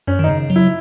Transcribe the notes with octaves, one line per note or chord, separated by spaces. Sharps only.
F#2 C#4
D#3
D#4
C#3
F#3
E4